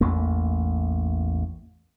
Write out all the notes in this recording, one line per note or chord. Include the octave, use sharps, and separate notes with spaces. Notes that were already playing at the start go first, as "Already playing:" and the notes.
A1 E2 A3 A#3